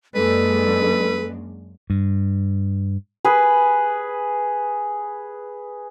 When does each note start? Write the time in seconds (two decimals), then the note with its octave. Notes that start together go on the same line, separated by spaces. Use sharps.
0.15 F#2 G#3 A#3 D4 A4 B4
1.90 G2
3.25 G#4 B4